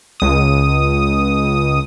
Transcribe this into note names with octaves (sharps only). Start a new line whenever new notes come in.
C#2 D#6